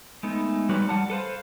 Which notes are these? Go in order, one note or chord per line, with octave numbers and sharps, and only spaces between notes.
G#3 A3 B3 D#4
G3 G#3 D#4 F#4 B4 C#5
G3 F#5 A5
A4 B4 C5 F5